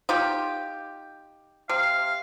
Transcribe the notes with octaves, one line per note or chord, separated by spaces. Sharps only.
D#4 F4 G4
C3 F5